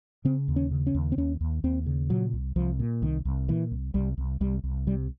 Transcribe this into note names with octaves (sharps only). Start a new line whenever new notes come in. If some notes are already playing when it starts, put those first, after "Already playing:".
C#3 C4
D#2
C#4
C#3
C#4
D#2
C4
D#2 C#4
D#2
D#2 C4
C#3
A#2 F#3
C2
C2 F3
A#2
C2 D#3
C2
A#2 E3
C2
C2 G3
C2
C2 G3
C2
C3 G3